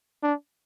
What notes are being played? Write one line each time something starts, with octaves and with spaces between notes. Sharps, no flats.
D4